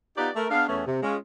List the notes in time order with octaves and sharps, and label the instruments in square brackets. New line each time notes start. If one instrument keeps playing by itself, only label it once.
[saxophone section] B3 D#4 F4 G4 B4 D5
A3 A#4
B3 D4 G#4 F5
E2 A3 B3 C#4
C3
G#3 C#4 F4